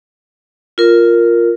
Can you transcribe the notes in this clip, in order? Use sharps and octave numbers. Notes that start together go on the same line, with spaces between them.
F4 A#4